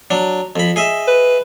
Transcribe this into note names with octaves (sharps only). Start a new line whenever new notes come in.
F#3 D4
F2 B5
G#4 D#5 E5
B4